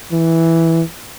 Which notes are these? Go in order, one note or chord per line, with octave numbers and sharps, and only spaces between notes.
E3